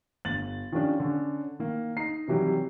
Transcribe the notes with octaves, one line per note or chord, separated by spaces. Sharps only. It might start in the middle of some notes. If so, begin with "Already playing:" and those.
G1 A6 F#7
D#3 F3 G3 C#4 D4
D3 C#4
D#3 A#3
D#4 A#5 C7
C3 D#3 E3 F#3 G3 G4